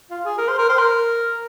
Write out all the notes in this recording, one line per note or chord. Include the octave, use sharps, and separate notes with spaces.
F4
G#4
A#4
C5
A#4
C5
A#4